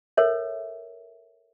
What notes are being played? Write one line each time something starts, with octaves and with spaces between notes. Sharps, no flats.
A4 A#4 C#5 E5